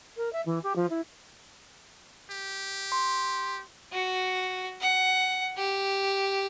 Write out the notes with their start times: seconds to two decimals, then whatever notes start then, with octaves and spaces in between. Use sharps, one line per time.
0.16 A#4
0.32 E5
0.45 E3
0.63 G4
0.75 F3
0.89 E4
2.30 G4
2.92 C6
3.92 F#4
4.80 F#5
5.57 G4